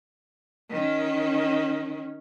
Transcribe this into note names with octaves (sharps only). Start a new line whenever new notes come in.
D#3 C#4